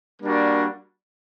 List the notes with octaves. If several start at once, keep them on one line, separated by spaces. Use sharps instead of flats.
G3 A#3 D4 F#4